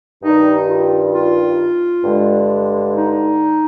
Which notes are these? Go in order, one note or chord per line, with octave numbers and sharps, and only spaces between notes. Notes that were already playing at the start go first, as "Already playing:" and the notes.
G2 D#3 G3 D#4
F4
F4
G2 D3 G#3
D#4